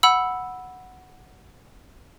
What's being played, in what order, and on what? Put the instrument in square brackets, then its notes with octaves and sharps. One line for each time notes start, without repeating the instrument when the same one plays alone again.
[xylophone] F#5 B5 E6